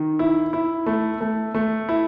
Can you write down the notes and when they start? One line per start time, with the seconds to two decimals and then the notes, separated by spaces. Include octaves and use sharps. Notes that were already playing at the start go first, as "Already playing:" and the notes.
Already playing: D#3
0.19 E4
0.53 E4
0.86 A3
1.21 A3
1.54 A3
1.89 E4